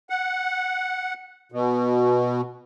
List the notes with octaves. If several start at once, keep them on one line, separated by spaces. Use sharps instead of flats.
F#5
B2